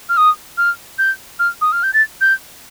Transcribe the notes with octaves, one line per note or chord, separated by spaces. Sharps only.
F6
D#6
F6
G6
F6
D#6
F6
G6
A6
G6